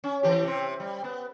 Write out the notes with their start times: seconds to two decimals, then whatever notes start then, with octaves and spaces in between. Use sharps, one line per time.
0.04 C#4
0.23 E3 G4
0.43 C3 C4
0.80 G3
1.04 B3